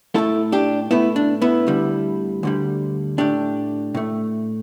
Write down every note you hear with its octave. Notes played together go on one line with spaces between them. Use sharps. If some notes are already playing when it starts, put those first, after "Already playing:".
A2 A3 E4 A4
D4 G4
A2 A3 B3 E4
D4
B3 E4
D2 D3 G3
D2 D3 G3
A2 A3 D4 G4
A2 A3